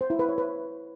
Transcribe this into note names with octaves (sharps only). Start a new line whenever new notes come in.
C5
E4
B4
C#5
B4